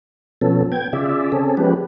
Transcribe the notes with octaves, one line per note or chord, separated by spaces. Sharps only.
B2 F3 B3 C#4 A4
B3 G5 G#6
C#3 F4 G#4 D5 E5
C4 C#4 G#4 A4
F3 G#3 B3 C#4 G4 B4